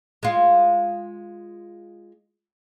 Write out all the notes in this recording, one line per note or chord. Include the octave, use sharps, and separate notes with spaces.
G#3 F4